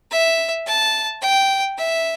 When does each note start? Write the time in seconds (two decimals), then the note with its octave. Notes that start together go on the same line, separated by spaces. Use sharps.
0.11 E5
0.67 A5
1.22 G5
1.78 E5